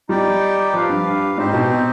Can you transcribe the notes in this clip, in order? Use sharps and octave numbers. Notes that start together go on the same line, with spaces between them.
G3 D#4 G4 D5 G5
F3 G4 B4 F5
G2
G#2 C4 D#4 G4 C5
B2